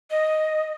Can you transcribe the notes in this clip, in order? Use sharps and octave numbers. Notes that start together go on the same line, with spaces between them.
D#5